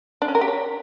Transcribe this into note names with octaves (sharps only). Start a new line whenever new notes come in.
D4
C#4
A#4
G4
C#5